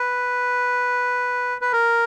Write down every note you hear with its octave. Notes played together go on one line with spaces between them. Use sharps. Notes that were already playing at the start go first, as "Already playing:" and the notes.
Already playing: B4
B4
A#4